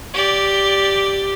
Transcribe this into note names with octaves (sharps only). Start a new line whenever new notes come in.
G4 D5